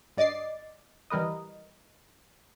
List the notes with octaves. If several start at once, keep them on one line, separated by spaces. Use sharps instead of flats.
G2 D5 D#5 D6 A6 C7
E3 G3 A#4 B4 D#5